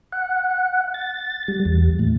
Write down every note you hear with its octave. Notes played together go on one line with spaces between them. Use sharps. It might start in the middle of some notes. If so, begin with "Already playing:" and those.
F#5
A6
G3
E2
A2